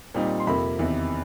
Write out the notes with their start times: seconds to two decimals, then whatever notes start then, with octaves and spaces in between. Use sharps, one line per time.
0.15 A#2 G3 C4 D#4
0.40 C6
0.47 F2 C3 F3 A#3 B5
0.79 E2 C3 D#3